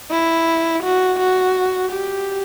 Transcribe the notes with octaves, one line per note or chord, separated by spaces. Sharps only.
E4
F#4
F#4
G4